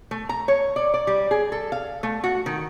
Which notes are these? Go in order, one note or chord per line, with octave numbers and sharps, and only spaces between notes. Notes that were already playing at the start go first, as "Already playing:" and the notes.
A3
A#5
C#5
D5
D5
G3
G#4
A4
F5
A3
F#4
D#3